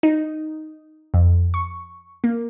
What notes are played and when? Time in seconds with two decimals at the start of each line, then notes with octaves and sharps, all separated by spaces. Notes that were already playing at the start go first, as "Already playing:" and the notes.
0.03 D#4
1.14 F2
1.54 C#6
2.24 A#3